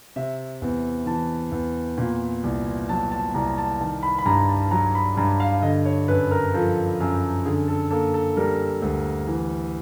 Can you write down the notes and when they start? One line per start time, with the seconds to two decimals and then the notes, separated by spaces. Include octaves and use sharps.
0.16 C3 E5
0.62 E2
1.06 E3 A5
1.52 E2
1.98 A#2
2.43 C2
2.89 F#3 A5
3.11 A5
3.34 C2 A#5
3.58 A5
3.80 D#3 A5
4.03 B5
4.18 B5
4.25 G2 A#5
4.49 A5
4.71 F#3 A#5
4.95 B5
5.17 G2 A#5
5.40 F5
5.62 D3 D#5
5.85 C#5
6.08 F#2 B4
6.31 A#4
6.54 F3 A4
7.00 F#2
7.45 D3 G#4
7.68 A4
7.91 A#3 A4
8.14 A4
8.37 G3 A#4
8.82 D2
9.28 E3